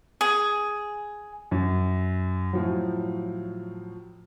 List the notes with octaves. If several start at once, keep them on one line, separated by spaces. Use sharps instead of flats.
G#4
F#2
A2 F3 F#3